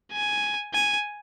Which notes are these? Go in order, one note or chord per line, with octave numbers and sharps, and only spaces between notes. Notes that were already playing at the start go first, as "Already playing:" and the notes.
G#5
G#5